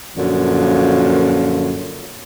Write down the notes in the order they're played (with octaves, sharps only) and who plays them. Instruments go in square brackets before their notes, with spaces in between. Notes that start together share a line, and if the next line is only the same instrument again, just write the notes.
[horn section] F#2 A#2 D3 F3